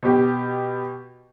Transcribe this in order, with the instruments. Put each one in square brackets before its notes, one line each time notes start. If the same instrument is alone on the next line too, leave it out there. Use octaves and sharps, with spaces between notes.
[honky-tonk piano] B2 G4